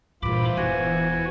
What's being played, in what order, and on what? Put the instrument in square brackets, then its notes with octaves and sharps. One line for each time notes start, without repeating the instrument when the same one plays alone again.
[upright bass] G2 A#2 [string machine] E3 [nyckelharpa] F4 C5 [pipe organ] B5 D6
[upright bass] E1 [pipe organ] F#4 G#5